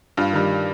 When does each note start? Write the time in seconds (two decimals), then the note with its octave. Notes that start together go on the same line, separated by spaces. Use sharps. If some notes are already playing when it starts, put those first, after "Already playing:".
0.17 G2 F4
0.33 D#3 G3